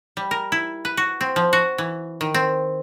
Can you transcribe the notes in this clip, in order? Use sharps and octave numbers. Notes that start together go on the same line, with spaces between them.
G3
A#4
E4
B4
F#4
C4
F3
F#4
E3
D#3
C4